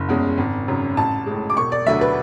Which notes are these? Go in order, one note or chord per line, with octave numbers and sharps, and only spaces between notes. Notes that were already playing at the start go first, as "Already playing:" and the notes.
Already playing: F#1
E2 C#3 G#3
G#1
F#2 C#3
A1 A5
A2 G#3
D6
E1 C#6
D5
D2 D3 F#3 E5
B4